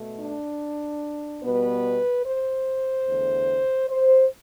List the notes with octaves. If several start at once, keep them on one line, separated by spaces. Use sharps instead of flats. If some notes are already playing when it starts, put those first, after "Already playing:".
Already playing: B2 A3
D4
B2 G3 B3 B4
C5
E2 D3 A3
C5